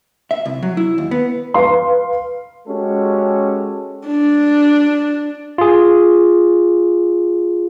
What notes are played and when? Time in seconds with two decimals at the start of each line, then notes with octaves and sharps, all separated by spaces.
0.31 E5
0.45 C2
0.63 F#3
0.77 E4
0.98 D#2
1.11 B3
1.54 B4 F5 C6
2.67 G#3 C#4 F#4 G4 A4
4.07 D4
5.58 F4 G#4